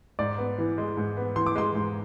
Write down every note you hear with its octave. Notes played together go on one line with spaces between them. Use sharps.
G#2 D5
B3
E3
G#3
G#2
B3
E3 C6
D6
G#3 C6
G#2